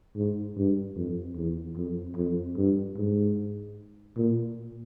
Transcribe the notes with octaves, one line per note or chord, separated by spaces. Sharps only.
G#2
G2
F2
E2
F2
F2
G2
G#2
A#2